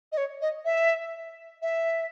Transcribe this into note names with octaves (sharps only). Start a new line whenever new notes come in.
D#5
C#5
D#5
E5
E5